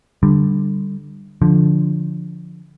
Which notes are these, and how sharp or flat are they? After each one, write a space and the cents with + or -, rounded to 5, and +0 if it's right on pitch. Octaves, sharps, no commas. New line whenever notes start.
D3 +5 G3 +0
D3 -5 F3 +0